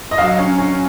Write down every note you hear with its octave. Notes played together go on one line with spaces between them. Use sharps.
D#5
F#3 F5
C#4
C#4